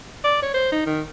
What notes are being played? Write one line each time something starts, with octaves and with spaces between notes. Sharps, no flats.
D5
C#5
C5
D#4
D#3